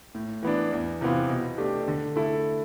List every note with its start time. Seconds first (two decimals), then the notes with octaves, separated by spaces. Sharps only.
0.15 A2
0.43 E3 B3 D4
0.72 E2
1.01 C3 E3 B3 F4
1.29 B2
1.58 A3 D4 G4
1.88 D3
2.16 A3 E4 A4